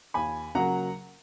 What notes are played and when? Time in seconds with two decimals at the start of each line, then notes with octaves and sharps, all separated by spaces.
0.14 D#2 G#5 B5
0.55 C#3 F#3 A#3 F#5 A#5